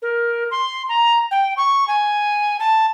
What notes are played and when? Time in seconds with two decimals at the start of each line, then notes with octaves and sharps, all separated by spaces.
0.02 A#4
0.51 C6
0.89 A#5
1.31 G5
1.57 C#6
1.88 G#5
2.60 A5